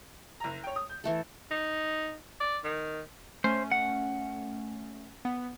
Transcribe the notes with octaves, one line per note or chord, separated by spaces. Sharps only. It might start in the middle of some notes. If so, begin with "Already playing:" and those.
F#1 A#5
C#5 G5
D#6
G6
E3 A3 A4
D#4
D5
D#3
A3 C#4 C5
F#5
B3